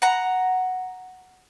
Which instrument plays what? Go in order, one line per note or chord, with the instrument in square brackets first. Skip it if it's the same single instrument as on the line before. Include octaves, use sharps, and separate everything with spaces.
[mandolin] F#5 A#5